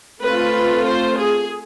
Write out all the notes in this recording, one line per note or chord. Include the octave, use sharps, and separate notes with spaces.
A3 C4 F4 B4
C5
G#4